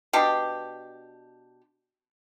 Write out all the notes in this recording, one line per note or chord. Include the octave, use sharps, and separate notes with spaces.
B2 D4 G4